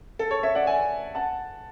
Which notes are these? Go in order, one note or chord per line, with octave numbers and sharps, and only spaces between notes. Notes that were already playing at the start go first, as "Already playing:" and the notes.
A4
A4 C#5
C#5 E5
D5 F#5
E5 G#5
F#5 A5